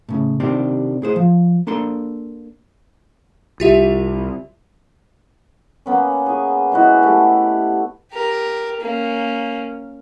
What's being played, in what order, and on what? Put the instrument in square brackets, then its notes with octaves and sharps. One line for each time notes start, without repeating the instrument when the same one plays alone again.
[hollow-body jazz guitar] A2 C#3
C3 D#3 C4 D4 G4
A2 G#4 C5
F3
A#3 D4 A4 C6
[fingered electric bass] C2 [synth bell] F4 G4 E5
[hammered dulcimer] A#3 B3 C#4
G#4 C#6
G#3 E4 F#4
A3 G4 A5
[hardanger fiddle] G4 A#4
A#3 C#4